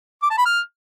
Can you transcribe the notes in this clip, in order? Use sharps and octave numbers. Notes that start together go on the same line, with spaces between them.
D6
A5
B5
F6